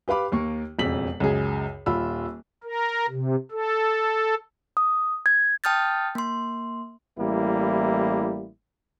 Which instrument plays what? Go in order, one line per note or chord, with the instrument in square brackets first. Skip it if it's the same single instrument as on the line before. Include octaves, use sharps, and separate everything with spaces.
[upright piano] G4 B4 F5 B5 D6
D#2 A#3 C#6
E1 F2 C#3 B6 F#7
C#2 F#2 G#4
D#1 F4 B5 E6
[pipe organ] A#4
C3
A4
[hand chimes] D#6
G#6
G5 A5 D#6 F6 G6 A6
A#3 C6
[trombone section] A1 G3 A#3 E4